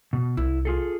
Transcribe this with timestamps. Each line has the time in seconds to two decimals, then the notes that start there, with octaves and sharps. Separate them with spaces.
0.13 B2
0.37 C2 E4
0.65 F4 G#4 A4